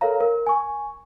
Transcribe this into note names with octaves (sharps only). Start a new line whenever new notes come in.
A4 A#4 C#5 F5 A#5
A#4
G#5 C#6